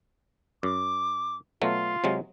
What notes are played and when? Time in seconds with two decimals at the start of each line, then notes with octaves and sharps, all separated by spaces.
0.63 F#2 D6
1.62 B2 F#3 A3 F4
2.04 C3 F#3 G#3